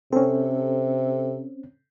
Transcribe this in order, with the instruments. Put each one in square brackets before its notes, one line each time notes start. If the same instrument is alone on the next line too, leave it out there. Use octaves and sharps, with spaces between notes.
[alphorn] C3 [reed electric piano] C4 C#4 [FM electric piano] A4